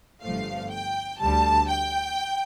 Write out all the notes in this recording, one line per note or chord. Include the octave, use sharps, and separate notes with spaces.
G1 G2 F3 A3 F5
G5
D2 D3 G3 A5
G5